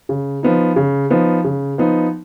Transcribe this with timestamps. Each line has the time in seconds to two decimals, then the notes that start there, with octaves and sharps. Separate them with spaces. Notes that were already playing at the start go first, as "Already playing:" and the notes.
0.09 C#3
0.43 F3 B3 D#4
0.76 C#3
1.10 F3 B3 D#4
1.44 C#3
1.78 F3 B3 D#4